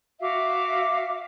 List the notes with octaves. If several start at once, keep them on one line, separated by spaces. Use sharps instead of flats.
F#4 E5 F5 D6